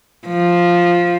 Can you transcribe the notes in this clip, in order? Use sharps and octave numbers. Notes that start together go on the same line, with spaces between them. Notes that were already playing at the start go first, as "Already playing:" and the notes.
F3